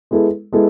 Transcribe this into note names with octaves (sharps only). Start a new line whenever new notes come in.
G#3 B3 E4 A4
G#3 B3 E4 A4